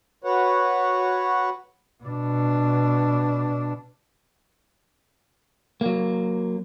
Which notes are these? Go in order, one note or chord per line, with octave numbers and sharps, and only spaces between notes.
F#4 B4 C#5 F#5
B2 D4
F#3 A#3